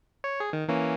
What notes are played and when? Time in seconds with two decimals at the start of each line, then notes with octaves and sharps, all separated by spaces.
0.24 C#5
0.40 G#4
0.53 D#3
0.68 E3 A#3 C#4